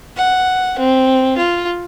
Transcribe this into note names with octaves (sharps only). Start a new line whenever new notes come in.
F#5
C4
F4